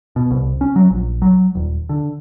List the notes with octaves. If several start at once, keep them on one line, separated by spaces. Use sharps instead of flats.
B2
C2
C#4
F#3
A#1
F#3
D#1
D3